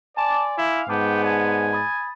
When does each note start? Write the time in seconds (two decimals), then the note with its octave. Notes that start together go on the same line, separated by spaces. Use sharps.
0.17 D5 G#5 A5 C6 D6
0.58 E4 F5
0.89 G#2 B3 G5 A5 D6
1.23 D5 G#5 A5
1.73 B5 D#6 A6